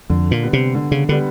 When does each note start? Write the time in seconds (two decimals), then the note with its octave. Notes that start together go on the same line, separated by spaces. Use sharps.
0.09 F2 D3
0.31 A#2
0.43 G3 B3
0.53 C3
0.75 D3
0.92 C#3
1.09 D3 G3 B3